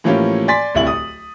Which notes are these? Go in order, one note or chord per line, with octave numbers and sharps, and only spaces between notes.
A2 E3 F3 A#3 C#4 G4
D5 G#5 C6 A6 B6
D1 C2 E4 F#7
D#6